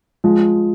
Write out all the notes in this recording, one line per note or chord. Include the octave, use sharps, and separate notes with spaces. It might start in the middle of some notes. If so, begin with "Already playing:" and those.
F3 G#3